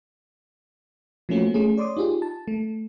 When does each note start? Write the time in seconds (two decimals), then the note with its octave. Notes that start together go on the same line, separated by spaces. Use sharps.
1.29 F3 A3 A#3 C#4 F4 F#4
1.54 A3 C#4 G#4
1.77 C#5 D5 C6 D6 D#6
1.97 D#4 F4 G4 G#4
2.22 A5
2.48 A3